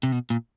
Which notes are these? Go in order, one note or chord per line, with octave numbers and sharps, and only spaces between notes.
C3
B2
A#2